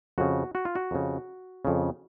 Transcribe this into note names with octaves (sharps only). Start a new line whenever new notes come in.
F2 C#3 F#4
F#4
F4
F#4
F2 C#3
F2 C#3